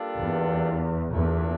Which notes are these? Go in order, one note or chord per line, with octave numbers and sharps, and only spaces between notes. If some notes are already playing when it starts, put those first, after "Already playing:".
Already playing: G3 A#3 D4 F4 A4
E2
E2 A#2 A3 D4